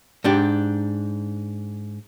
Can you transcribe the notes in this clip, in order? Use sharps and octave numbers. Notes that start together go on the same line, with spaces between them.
G#2 D4 G4